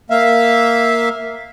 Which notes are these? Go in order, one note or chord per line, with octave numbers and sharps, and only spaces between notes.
A#3 E5 F5